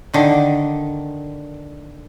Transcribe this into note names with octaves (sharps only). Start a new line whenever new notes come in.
D3 D#3